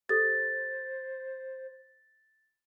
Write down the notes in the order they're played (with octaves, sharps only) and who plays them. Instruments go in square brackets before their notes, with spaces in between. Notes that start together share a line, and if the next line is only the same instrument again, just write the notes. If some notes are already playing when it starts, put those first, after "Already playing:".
[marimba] G4 A4 D#6 [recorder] C5 [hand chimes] A6